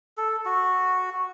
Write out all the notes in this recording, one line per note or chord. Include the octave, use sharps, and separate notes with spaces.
A4
F#4